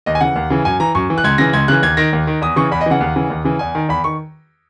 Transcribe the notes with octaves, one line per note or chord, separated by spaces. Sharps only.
D#2 D#5
G#5
C#3 E3 F#5
D#2
C#3 E3
F#2 G#5
E3 A#5
F#2 C#6
E3
F#6
C#2 G#6
C#3 E3 A#6
C#2 G#6
C#3 E3 F#6
D#2 G#6
D#3 A#6
D#2
D#3
E2 D#6
C#3 E3 C#6
E2 B5
D#5
C#3 E3 F#5
D#2
C#3 E3
D#2
C#3 E3
E2 G#5
D#3
E2 B5
D#3 C#6